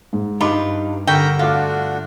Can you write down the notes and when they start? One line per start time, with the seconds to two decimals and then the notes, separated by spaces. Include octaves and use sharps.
0.13 G#2
0.41 G2 D#4 F4 B5 D6
1.07 D3 A#4 G5 A#5 B5 C#6
1.39 A3 D4 F4 F#4 F5 D6